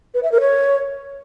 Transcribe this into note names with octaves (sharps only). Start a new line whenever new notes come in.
B4
E5
A#4
C#5